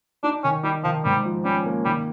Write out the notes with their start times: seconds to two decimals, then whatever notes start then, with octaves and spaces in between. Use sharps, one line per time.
0.24 D4 D#4
0.44 D#3 C#4
0.63 G3 D#4
0.84 D#3 F3
1.04 G#2 G3
1.25 F3
1.44 G3 C#4
1.65 A#3
1.85 D#3 G3